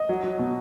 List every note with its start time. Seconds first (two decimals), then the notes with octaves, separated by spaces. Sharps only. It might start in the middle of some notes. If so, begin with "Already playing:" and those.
Already playing: D#5
0.09 F#3
0.24 F#3
0.39 B2